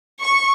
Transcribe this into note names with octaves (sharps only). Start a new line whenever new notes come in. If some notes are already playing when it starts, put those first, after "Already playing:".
C#6